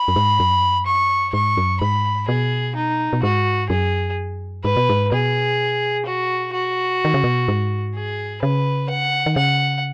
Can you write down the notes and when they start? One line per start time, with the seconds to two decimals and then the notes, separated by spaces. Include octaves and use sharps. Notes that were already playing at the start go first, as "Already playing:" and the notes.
Already playing: B5
0.08 F#2
0.16 G#2
0.40 F#2
0.86 C#6
1.33 G#2 C#6
1.57 F#2
1.81 G#2 B5
2.28 B2 G#4
2.75 D#4
3.13 B2
3.23 G#2 F#4
3.69 F#2 G#4
4.64 G#2 B4
4.77 B2
4.89 G#2
5.12 B2 G#4
6.06 F#4
6.53 F#4
7.05 D#3
7.14 C#3
7.24 B2
7.48 G#2
7.95 G#4
8.42 C#3 B4
8.90 F#5
9.26 D#3
9.36 C#3 F#5